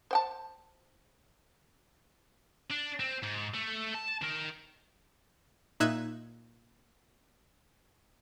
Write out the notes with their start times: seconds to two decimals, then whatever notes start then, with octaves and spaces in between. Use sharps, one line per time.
0.11 C5 G5 A5
2.70 D4
3.00 C4
3.23 G#2
3.55 A3
3.94 A5
4.22 D#3 A#4
5.80 A#2 D#4 E5 E6 F#6 G#6